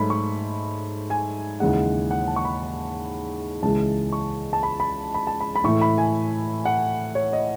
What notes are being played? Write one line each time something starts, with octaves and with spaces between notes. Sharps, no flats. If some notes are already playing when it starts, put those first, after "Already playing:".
Already playing: G#2 F#3 A3 B5
C#6
G#5
D#2 C#3 E3 G#3 F#5
F#5
A5
C#6
B5
C#2 C#3 E3 G#3 A5
C#6
A5
B5
B5
B5
A5
B5
B5
A2 E3 A3 C#6
B5
G#5
F#5
C#5
D#5